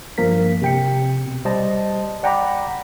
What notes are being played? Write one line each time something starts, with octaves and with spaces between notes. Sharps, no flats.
G2 F3 A#3 A#4 B6
C3 G5 C#7
B2
G3 C5 D#5 A5
D5 F#5 G5 A#5 B5 D6